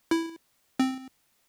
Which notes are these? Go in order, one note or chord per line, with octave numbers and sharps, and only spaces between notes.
E4
C4